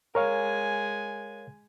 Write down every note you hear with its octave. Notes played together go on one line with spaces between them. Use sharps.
G#3 A#4 C#5 F5 G#5